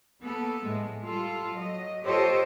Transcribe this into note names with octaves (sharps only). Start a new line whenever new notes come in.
A#3 B3 A4
A2 G#3
G3 F4 A4
F#3 D#5
F4 G4 A4 C5 C#5 D#5